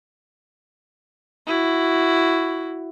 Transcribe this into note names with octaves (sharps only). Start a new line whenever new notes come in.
E4 F#4